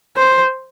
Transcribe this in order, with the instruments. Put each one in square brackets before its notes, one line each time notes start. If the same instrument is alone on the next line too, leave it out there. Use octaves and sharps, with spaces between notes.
[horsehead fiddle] C5